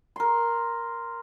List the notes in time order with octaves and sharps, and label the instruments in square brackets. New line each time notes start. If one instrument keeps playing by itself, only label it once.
[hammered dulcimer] A#4 C6